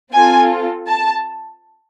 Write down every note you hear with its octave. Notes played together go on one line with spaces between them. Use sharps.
C4 F4 A4 G#5
A5